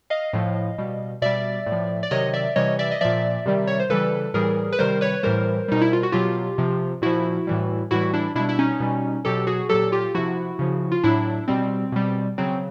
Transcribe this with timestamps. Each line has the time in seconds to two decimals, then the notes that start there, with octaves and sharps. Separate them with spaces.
0.10 D#5 F5
0.33 A2 F3
0.78 B2 G3
1.22 B2 G3 D5 E5
1.66 A2
1.72 F3
2.03 D5
2.11 C3 D#3 F#3 C#5 D#5
2.33 D5 E5
2.56 C3 E3 G3 C#5 D#5
2.79 D5 E5
2.91 D#5
3.01 A#2 F3 D5 E5
3.45 C3 D#3 G3
3.67 C#5
3.80 C5
3.90 C#3 E3 G3 A4 B4
4.34 A2 E3 G3 G#4 A#4
4.72 B4
4.79 C3 D#3 G3 A#4 C5
5.01 B4 C#5
5.23 A2 E3 G3 A#4 C5
5.68 B2 G3 D#4
5.81 E4
5.93 F4
6.03 F#4
6.12 B2 F#3 F4 G4
6.58 C3 F3
7.02 A#2 F3 E4 F#4
7.47 A2 E3 G3
7.91 A2 E3 G3 E4 F#4
8.13 D4 E4
8.35 B2 D4 E4
8.40 G3
8.49 E4
8.59 C#4 D#4
8.80 B2 G3
9.25 B2 F#3 G4 A4
9.47 F#4 G#4
9.69 A#2 F#3 G4 A4
9.92 F4 G4
10.15 C3 F3 E4 F#4
10.59 C#3 F3
10.92 F4
11.03 A2 F#3 D4 E4
11.48 B2 G3 C4
11.92 B2 G3
12.38 C#3 F#3 C4